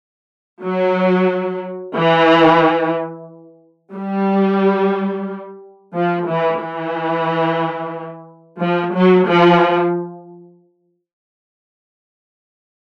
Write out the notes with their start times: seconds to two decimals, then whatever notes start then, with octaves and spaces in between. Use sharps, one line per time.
0.63 F#3
1.96 E3
3.94 G3
5.94 F3
6.27 E3
6.61 E3
8.61 F3
8.94 F#3
9.27 F3